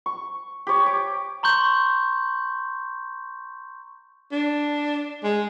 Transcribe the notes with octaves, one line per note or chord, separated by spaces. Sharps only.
C#6
G4 C#5
D6
A#5 C6 C#6 G6
D4
G#3